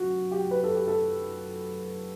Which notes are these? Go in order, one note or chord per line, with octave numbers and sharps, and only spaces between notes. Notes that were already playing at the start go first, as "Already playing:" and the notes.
Already playing: F#2 F#4
G4
B4
A4
G4
A4